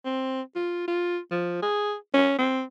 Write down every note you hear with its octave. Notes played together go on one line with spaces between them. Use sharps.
C4
F4
F4
F3
G#4
C#4
C4